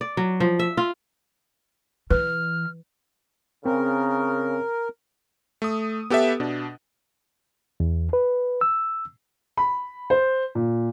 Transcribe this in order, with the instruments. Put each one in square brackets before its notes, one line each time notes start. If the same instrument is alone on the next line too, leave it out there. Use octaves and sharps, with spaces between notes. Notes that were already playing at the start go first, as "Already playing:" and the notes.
[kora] D5
F#3
F3
E5
F4
[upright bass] E3 [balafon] B4 [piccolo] F6
[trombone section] C#3 [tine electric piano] C4 [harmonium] A#4
[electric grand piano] A3 D#6
B3 G4 A4 B4 E5
B2 D4
[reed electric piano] E2
B4
E6
[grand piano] B5
C5
A#2